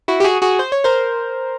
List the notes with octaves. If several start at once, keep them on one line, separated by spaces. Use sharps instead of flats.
E4 F#4
G4
F#4 G#4
F#4 G#4
C5
C#5
A#4 C5